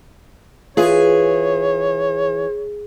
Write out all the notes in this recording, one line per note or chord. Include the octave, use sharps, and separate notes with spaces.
E3 F4 G#4 C#5